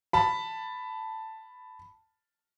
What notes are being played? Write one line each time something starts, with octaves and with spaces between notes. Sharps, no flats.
A5 B5